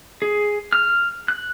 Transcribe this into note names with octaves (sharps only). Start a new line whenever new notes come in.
G#4
F6
F#6